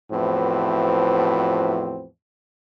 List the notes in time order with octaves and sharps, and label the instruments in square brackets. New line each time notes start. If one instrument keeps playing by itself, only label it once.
[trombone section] E2 A2 F3 C4 F#4 B4